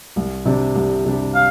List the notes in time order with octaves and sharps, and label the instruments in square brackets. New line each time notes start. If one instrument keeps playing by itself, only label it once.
[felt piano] C2
C3 G3 D4 G4
C2
C3 G3 D4 G4
[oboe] F5